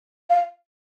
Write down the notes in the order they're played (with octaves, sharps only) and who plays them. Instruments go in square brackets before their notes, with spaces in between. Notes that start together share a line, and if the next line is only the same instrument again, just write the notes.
[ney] F5